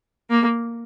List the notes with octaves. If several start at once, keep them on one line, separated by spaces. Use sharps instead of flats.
A#3